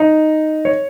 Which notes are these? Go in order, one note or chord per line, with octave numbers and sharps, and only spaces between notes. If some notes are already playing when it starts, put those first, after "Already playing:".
Already playing: D#4
C#5